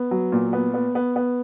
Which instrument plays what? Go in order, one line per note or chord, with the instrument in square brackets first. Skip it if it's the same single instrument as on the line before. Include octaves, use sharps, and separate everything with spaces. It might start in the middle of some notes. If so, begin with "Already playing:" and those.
Already playing: [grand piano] B3
F#3
A#2
B3
B3
B3
B3